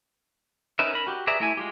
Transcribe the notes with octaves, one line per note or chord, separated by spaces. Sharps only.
C#4 D#4 A#4 B4 E5
A#4 B5
F#4 G4
G#4 B4 D5 E5 A#5
A3 E4 G#5
G#3 F4 G4